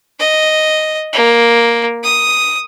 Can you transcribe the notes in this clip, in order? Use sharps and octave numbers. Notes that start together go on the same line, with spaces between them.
D#5
A#3
D#6